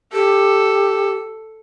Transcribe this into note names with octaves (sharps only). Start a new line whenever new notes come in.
G4 A4